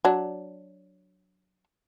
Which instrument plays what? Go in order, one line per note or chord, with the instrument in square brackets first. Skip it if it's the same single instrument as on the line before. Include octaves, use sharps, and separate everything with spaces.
[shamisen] F#3 D4